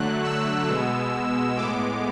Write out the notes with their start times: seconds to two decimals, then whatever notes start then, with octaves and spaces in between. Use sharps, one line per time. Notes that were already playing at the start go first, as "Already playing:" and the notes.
Already playing: D3 F#3 A3 F#6
0.24 E6
0.68 B2 G#3 B3
1.57 A2 G#3 B3 D6